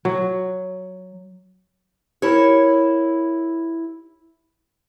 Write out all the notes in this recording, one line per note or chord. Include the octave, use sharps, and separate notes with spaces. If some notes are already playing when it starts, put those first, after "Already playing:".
F#3
E4 G4 A#4 C#5